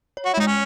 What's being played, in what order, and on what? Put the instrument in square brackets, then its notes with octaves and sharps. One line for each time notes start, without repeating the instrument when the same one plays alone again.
[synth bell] C#5
[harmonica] F#4
E4
[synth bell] G#3 [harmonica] D#4
[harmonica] C#4